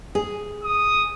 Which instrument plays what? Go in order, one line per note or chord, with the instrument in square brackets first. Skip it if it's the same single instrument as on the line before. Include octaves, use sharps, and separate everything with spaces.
[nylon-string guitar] G#4
[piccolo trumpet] D#6